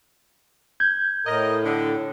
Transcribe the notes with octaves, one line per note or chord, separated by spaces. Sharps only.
G6 G#6
A2 A#4 D#5
D3